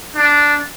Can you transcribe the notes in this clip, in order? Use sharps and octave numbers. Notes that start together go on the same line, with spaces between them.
D4